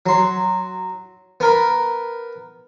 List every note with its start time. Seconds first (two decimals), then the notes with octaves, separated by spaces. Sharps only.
0.06 F#3 C6
1.40 B3 A#4 B5